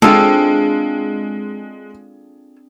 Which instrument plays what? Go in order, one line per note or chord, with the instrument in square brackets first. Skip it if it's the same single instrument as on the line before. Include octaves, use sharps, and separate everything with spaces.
[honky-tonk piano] G#3 [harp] C4 D4 G#4 [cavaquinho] F4 A4